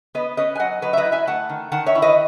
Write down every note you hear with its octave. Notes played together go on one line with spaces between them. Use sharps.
B3 B4 D#5
C#4 B4 D#5
G#5
F#3 D#5 F#5
F#3 B4 D#5
E5
B4 D#5
E4
E5 G#5
A3 F#5 A5
D#3
D#3 F#5 A5
C#5 E5
E4
B4 D#5